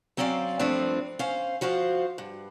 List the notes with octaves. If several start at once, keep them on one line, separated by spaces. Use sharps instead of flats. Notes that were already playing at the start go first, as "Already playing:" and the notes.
F#3 C4 C#4 D5 E5 F5
G2 F3 A3 C4 D4
C#4 C5 F5
F3 F#4 C5 F5
G2